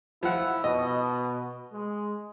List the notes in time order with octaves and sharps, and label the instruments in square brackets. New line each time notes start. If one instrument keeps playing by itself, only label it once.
[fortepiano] F3 F#5 [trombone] E4
[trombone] B2 [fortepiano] D#5
[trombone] G#3